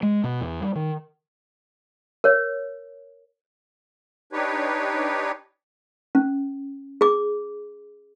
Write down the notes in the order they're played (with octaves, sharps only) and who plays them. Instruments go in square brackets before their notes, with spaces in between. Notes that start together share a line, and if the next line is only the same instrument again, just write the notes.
[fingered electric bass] G#3
B2
E2
G3
D#3
[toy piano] A#4 C#5
[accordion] D4 D#4 G4 B4 C#5
[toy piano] C#4
G#4 D6